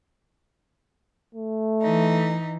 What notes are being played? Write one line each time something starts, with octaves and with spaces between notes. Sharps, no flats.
A3
E3 D#4